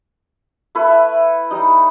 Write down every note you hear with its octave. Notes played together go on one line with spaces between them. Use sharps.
A3 E4 B4
G3 D#4